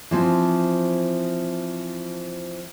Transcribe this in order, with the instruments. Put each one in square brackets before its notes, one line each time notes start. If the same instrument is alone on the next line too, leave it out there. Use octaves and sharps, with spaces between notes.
[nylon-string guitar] E3 F3 C4